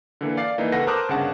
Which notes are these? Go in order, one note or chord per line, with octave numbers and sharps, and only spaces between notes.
D3 E3 A#3
D5 F5 A6 C7
E3 A#3 D#4
C#2 A4 B4 F#5 A#6
A#4 C5 A5 D6 D#6 F#6
G1 C#3 D4 F#5 A5